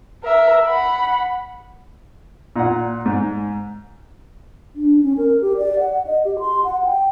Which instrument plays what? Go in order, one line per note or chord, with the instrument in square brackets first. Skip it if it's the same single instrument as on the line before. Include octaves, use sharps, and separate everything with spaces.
[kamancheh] A#4 E5
F#5 B5
[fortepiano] A#2 F#5
G#2
[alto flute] D4
C#4
A#4
G4
D5
F#5
D#5
G4
C6
F#5
G5